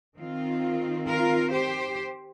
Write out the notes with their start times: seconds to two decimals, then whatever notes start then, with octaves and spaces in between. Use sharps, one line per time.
0.18 D#3 C4 F4
1.06 F4 A#4
1.51 G4 C5